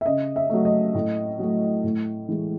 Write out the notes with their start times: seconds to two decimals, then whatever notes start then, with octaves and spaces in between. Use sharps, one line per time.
0.01 E5
0.06 C#3 D#5
0.36 E5
0.50 F#3 A3
0.65 D#5
0.95 A2
1.39 F#3 A3
1.84 A2
2.29 E3 G#3